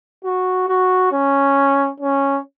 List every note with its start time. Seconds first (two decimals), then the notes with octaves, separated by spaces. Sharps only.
0.24 F#4
0.68 F#4
1.12 C#4
2.00 C#4